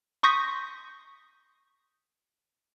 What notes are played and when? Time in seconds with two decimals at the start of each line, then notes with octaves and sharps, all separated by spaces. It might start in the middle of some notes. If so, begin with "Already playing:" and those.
0.23 C6 C#6 D#6 G6 A#6 B6